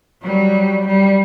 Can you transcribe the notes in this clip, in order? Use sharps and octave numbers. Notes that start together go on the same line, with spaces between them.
F#3 G3
G3